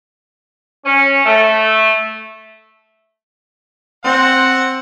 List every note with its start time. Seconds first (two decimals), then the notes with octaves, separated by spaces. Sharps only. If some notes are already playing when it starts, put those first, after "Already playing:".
0.85 C#4
1.25 A3
4.04 C4 F#5